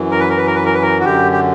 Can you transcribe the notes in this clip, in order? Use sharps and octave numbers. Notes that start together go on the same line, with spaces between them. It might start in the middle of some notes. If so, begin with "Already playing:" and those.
Already playing: F#2 E3
A#4
B4
A#4
B4
A#4
B4
A#4
B4
A#4
F#4
F#2 D3 G4
G4